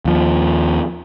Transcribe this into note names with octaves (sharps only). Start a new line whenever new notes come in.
D#2 F3